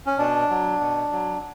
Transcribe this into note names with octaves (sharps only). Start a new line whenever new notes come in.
C#4
B2 D4
F#3
B2
F#3